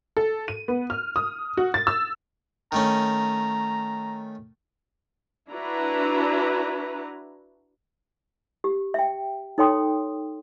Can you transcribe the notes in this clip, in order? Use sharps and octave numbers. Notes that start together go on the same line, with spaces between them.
A4
D#7
B3
F6
D#6
F#4
A6
E6
D#3 A3 C#4 A#5
D4 E4 F#4 B4 A#5
G4
E5 G5
D#4 A4 C#5 G5 C6 D#6